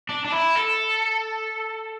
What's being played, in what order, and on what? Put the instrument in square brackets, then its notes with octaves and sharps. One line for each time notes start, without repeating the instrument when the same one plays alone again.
[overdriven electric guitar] D4
D4
E4
A4